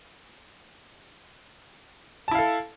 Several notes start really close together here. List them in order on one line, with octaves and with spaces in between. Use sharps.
A5 E4 F5 A4